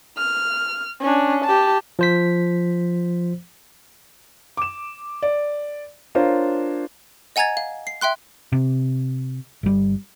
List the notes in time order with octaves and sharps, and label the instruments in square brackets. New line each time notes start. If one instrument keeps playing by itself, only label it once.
[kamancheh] F6
C#4 D4
G4 A5
[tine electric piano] F3 C5 B6
[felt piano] D6 E7
D5
D4 F4 A#4 C5 C#5
[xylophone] D#5 F#5 G#5 A#5 G#6 A6
F5
C7
E5 G5 C6 F#6
[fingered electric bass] C3
G1 G3